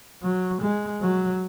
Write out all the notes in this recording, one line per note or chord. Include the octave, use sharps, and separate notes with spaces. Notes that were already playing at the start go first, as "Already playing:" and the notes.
F#3
G#3
F#3